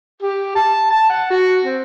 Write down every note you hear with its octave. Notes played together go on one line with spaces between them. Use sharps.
G4
A5
A5
F#5
F#4
C4